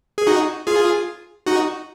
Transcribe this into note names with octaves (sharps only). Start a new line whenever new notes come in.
G#4
D#4 F#4
F4 G#4
D#4 F#4